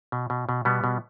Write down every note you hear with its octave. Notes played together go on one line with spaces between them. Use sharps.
B2
B2
B2
B2 G3 B3
B2